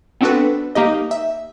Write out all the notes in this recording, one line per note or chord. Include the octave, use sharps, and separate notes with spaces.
B3 C4 D4 F#4 A4 B4
A#3 D#4 G4 D#5
E5